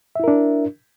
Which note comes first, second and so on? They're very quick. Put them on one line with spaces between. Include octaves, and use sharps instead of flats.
E5 E4 A#4 D4